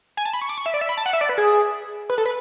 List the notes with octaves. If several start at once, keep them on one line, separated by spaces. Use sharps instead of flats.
G#5
A5
B5
C#6
D6
C#6
E5
D5
E5
B5
A5
F#5
E5
D5
B4
G#4
B4
A4
B4